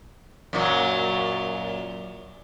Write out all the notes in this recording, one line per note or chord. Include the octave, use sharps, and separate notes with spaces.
F#2 A#2 F#3